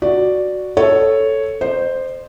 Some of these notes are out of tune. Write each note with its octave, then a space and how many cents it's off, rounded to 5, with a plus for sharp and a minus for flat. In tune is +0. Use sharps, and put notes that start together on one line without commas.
F#4 +0 D5 +0
A4 +0 C#5 +0
C5 +0 D#5 -45